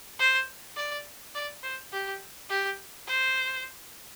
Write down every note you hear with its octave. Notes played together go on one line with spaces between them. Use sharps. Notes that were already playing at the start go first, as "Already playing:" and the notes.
C5
D5
D5
C5
G4
G4
C5